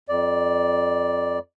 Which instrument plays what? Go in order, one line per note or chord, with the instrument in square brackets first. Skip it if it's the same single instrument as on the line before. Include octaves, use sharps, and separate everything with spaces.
[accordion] F2 D5